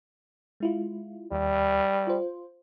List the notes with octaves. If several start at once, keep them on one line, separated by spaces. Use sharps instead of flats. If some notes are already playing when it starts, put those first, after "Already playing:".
G#3 E4 F4
D#2 G3
F4 C5